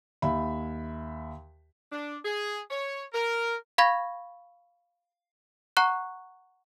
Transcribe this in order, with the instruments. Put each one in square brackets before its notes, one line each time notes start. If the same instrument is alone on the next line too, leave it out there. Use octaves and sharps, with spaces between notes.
[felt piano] D#2 E5 B5
[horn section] D4
G#4
C#5
A#4
[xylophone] F5 B5 C#6 G#6 A#6
F#5 A#5 C#6 F#6